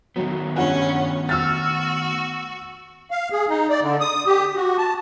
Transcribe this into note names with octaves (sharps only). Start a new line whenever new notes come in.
D#3 F#3 A3 B3
G2 C#4 F4 F#5
F#4 E6 F6 A6
F5
G#4
D#4
D5
D3
D#6
G4
F#4
A5